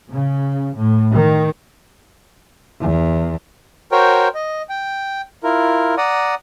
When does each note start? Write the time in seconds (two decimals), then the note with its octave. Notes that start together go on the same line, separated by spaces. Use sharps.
0.11 C#3
0.75 A2
1.10 D#3
2.80 E2
3.92 F#4 A#4 C5 C#5 G5
4.35 D#5
4.69 G5
5.44 E4 F4 A#4
5.97 D5 F#5 A#5 D#6